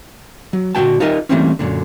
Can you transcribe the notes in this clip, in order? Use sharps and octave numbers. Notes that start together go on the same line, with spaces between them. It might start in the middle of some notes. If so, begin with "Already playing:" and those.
F#3
A#2 D3 E3 F#4 G5 A5
D#4 F4 G4 A#4 D#5 E5
E3 G3 A3 A#3 C4 C#4
F#2 A#2 D3